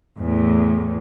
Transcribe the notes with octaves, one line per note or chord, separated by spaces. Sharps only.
E2 A2